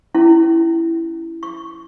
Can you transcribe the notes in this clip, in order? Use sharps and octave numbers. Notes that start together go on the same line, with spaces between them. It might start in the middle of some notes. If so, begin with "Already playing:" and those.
C#4 E4
C#6